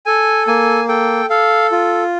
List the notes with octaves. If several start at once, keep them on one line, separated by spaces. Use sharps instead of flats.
A4 G#5
A#3 G#5
A4 G5
A4 F5
F4